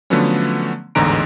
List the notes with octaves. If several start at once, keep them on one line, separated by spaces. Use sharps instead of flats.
D3 F3 F#3 A3 B3 C#4
A1 E2 G#2 D3 A#5 D7